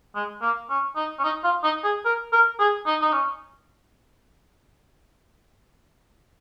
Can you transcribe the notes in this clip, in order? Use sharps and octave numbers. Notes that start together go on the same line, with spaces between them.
G#3
A#3
C#4
D#4
C#4
D#4
F4
D#4
G#4
A#4
A#4
G#4
D#4
D#4
C#4